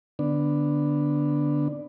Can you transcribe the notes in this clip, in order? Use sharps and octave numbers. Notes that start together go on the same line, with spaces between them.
D3 B3 D4